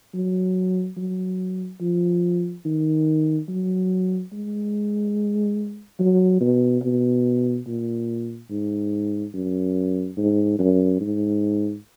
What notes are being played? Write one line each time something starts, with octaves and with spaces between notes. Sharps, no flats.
F#3
F#3
F3
D#3
F#3
G#3
F#3
B2
B2
A#2
G#2
F#2
G#2
F#2
G#2